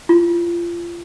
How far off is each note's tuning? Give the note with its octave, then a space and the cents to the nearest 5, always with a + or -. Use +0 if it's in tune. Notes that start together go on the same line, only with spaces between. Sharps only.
F4 -25